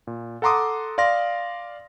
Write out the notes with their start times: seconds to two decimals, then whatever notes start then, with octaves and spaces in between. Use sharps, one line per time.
0.07 A#2
0.42 A4 F#5 A#5 C6 D6 D#6
0.98 D5 F5 C6 A#6